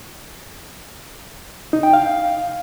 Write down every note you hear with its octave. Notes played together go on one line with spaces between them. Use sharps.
D#4
G5
F5